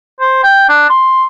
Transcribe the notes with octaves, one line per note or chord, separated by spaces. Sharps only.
C5
G5
D4
C6